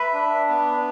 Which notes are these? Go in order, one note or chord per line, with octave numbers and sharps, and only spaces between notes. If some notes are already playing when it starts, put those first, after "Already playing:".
Already playing: B4 E5
D4
B3